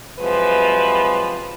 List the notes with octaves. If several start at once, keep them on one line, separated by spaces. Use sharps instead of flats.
C3 F3 F#3 G#3 B4